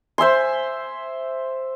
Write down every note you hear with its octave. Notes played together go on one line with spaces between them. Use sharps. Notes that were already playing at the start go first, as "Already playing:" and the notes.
C5 E5 G#5 C6